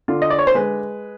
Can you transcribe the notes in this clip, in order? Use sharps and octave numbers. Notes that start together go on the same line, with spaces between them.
D3 F4
D#5
D5
C#5
C5
G#3 B4